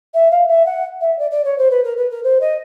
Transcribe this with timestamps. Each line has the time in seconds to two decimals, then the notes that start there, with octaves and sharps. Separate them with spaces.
0.14 E5
0.31 F5
0.48 E5
0.66 F#5
1.01 E5
1.19 D5
1.31 D5
1.44 C#5
1.58 C5
1.71 B4
1.84 A#4
1.97 B4
2.10 A#4
2.23 C5
2.41 D#5